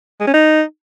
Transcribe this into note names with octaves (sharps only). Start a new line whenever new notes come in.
G#3
C#4
D#4